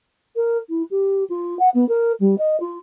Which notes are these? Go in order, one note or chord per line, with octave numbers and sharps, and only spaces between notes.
A#4
E4
G4
F4
F#5
B3
A#4
G3
D#5
F4